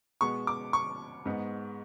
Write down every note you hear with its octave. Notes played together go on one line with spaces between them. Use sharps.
B2 G#3 B3 C#6
D6
C#6
G#2 G#3 B3